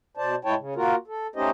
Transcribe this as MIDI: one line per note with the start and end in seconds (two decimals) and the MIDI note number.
0.17 0.35 47
0.17 0.35 72
0.17 0.35 74
0.17 0.35 81
0.45 0.55 45
0.45 0.55 56
0.45 0.55 64
0.45 0.55 73
0.45 0.55 79
0.45 0.55 81
0.58 0.74 49
0.76 0.95 58
0.76 0.95 65
0.76 0.95 66
0.76 0.95 70
1.08 1.27 69
1.36 1.50 57
1.36 1.50 61
1.36 1.50 63
1.36 1.50 67
1.36 1.50 72
1.36 1.50 75